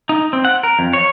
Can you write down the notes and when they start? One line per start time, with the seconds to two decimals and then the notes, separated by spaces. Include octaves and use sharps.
0.09 D#4
0.33 C4
0.45 F#5
0.63 A#4
0.79 F2
0.93 C#5